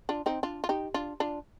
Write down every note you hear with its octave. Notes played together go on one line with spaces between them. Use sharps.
D4 F4
C4 D#4
D4 F4
F4
D#4 G4
D4 F4
D4 F4